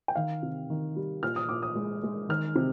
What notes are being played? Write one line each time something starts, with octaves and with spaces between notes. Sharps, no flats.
G5
D#3 F5
C3
D#3
G3
A#2 F6
D#6
A#2 D6
D#6
G#3
G#3
D#3 F6
C3